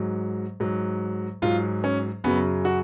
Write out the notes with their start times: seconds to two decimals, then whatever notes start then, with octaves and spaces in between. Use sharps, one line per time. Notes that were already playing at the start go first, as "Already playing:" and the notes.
Already playing: G#2 F#3
0.60 G#2 F#3
1.42 G#2 F#3 F4
1.84 C#4
2.24 F#2 C#3 F#3 B3
2.65 F#4